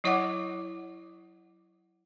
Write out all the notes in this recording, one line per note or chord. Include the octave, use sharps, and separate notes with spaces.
F#3 E4 C#5 D#5 F#5 D6